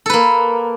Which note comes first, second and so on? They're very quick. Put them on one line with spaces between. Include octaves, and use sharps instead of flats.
A4 B4 A#3